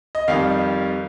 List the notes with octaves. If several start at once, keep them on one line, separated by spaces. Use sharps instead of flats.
D#5
F2 D#3 G3 F5